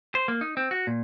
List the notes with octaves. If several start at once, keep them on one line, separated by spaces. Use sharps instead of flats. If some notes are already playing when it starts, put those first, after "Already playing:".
C5
A#3
D#4
C4
F#4
A#2